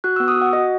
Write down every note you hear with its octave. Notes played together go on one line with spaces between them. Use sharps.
F#4 F#6
E6
B3
D#6
F#4
F#5
F#4 D#5